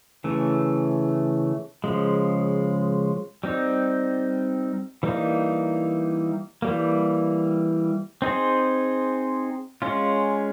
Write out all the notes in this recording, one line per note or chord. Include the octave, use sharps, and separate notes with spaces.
C#3 E3 A3
C#3 F3 G#3
G3 C4 D#4
E3 G3 A#3 D#4
E3 G3 A#3
C4 D#4 G#4 C5
G#3 C#4 F4